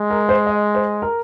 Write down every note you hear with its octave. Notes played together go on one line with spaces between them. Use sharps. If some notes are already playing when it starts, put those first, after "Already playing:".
Already playing: G#3
A#4
C5
D#5
C5
A#4